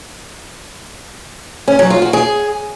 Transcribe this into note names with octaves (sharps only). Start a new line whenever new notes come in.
C#4
F#3
F4
F#4
G#4